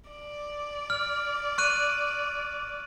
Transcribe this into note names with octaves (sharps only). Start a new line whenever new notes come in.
D5
F6
C#6 F#6 D#7